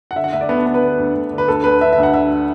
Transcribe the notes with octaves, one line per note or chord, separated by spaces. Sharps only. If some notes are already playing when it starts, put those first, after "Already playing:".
F#5
D3 E5
F#5
D2 E5
D5
D3 B3
D4
D3 B3
B4
D3
D2
D2
D3
B4
D2 A4
D2 B4
D3 E5
E5
D2
F#5
D3 E5